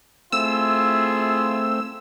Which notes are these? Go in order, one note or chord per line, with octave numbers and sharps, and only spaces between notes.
A3 C4 E4 F4 G#4 E6